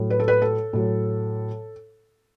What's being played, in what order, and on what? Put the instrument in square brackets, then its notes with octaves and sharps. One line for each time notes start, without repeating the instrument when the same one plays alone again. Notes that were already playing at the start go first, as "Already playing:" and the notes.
Already playing: [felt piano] A2 F#3
B4
A4
B4
A4
A2 F#3